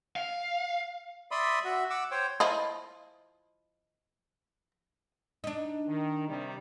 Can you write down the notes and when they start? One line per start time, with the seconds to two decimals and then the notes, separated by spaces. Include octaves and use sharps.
0.16 F5
1.31 D5 E5 B5 C6 D#6
1.65 F#4 E5
1.90 F#5 D6 E6
2.11 C5 C#5 G5
2.40 F3 E4 F4 D#5
5.44 D4 D#4
5.87 D#3
6.28 C3 D#3 G3